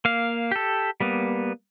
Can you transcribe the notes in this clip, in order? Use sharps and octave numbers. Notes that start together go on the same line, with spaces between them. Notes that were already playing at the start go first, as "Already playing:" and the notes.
A#3 F5
G4 A4
G3 A#3 B3